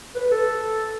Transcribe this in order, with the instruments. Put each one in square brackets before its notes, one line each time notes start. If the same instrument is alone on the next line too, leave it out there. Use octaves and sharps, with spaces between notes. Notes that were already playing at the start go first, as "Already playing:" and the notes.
[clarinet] B4
A4